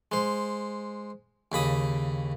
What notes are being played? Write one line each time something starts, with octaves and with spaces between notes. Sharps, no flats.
G#3 C5
D#2 C#3 B5 D#6